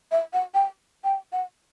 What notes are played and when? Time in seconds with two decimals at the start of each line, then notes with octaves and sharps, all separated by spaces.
0.11 E5
0.33 F#5
0.54 G5
1.04 G5
1.32 F#5